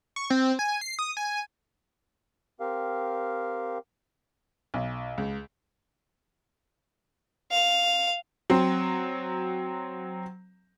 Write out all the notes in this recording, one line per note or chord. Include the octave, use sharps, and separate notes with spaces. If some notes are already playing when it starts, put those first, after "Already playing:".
C#6
C4
G#5
C7
D#6
G#5
C4 G4 A#4 F5
B1
C#2
F5
F#3 C4